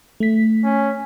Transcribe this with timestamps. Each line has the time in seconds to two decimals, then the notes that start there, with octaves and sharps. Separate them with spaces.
0.20 A3 B6
0.64 C#4